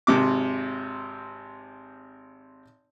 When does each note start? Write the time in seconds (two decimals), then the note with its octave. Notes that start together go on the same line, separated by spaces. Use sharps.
0.07 G#1 C3 D6